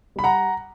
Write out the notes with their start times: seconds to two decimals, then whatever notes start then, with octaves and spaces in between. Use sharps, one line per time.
0.16 G3 B5
0.24 F#5 A#5